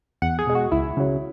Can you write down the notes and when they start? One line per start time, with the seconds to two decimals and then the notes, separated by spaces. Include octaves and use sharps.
0.22 E2 F#5
0.39 G#4
0.47 B2 G#3
0.55 F#4
0.72 C#2 E4
0.97 C#3 F#3